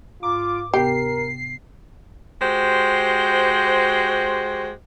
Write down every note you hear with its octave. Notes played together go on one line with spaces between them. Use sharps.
G#2 F4 A#5 D6
D2 C3 B3 G4 A#4 C7
G#3 F#4 G4 C5